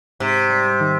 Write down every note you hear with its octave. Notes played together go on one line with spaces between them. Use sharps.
G#2 C3
G3
D#3